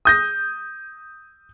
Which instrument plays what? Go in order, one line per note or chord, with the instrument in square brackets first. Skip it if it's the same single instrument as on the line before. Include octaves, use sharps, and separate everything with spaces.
[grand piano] D#6 G6 A#6